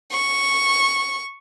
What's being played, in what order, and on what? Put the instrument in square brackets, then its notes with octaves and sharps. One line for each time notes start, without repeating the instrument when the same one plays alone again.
[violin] C#6